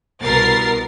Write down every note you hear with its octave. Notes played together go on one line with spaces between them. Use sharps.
C2 B2 A#4 A6 C7